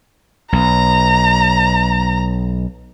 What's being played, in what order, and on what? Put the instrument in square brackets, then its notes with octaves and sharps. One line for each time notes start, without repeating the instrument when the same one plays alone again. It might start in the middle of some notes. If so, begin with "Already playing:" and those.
[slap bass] B1 [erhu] A#5